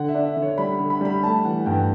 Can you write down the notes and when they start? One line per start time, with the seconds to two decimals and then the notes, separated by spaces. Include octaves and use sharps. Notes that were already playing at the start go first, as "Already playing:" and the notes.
Already playing: D3 F#5
0.08 E5
0.14 D4
0.25 E5
0.37 D3
0.42 C#5
0.58 G3 B5
0.79 D3
0.90 B5
1.01 G3 B5
1.23 A3 A5
1.45 E3 F#5
1.66 G2 G5